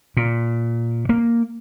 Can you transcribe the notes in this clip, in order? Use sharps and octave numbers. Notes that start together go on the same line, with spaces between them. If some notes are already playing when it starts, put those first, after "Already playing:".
A#2
A#3